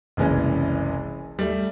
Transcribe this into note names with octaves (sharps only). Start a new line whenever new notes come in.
F#1 C2 E3 G#3 C#4
G3 A3